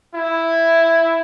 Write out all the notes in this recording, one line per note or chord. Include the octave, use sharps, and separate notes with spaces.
E4